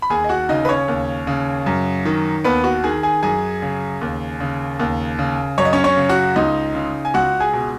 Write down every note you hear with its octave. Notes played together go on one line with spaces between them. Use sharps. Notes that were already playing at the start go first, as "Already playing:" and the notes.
B5
D#2 G#4 G#5
D#5
F#4 F#5
C#3 D#4 D#5
B4
C#4 C#5
D#2
C#3
F#2
D#3
D#2 B3 B4
F#4
D#3 G#4 G#5
G#4 G#5
F#2 G#4 G#5
C#3
D#2
C#3
D#2
C#3
F#2 C#5
D#5
C#4 C#5
C#4 C#5
C#3
F#4 F#5
C#2 D#4 D#5
C#3
G#5
C#2 F#4 F#5
G#4 G#5
B2